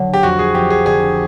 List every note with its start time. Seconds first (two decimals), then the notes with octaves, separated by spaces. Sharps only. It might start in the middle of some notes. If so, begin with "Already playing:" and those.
Already playing: D3 F#3
0.14 G4
0.23 F2 F#4
0.39 G#4
0.55 F2 G4
0.70 G#4
0.86 D3 G#4